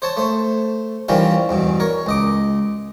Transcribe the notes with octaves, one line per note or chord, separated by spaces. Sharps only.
C5 C#5 A5
A3 C5
D#3 E3 G3 C4 C#4 F4
E2 G2 B2
A#4 C#5
C#2 D#5 D6